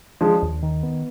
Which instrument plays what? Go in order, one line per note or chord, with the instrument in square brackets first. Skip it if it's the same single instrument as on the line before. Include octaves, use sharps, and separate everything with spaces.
[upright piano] F3 G#3 [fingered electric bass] D4
[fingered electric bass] D#2
D#3
B3